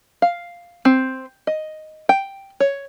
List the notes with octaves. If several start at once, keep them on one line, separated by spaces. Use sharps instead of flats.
F5
C4
D#5
G5
C#5